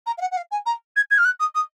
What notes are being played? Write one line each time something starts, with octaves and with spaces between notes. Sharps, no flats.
A#5
F5
F#5
F#5
F5
G#5
A#5
G#6
G#6
F6
F#6
D#6
D#6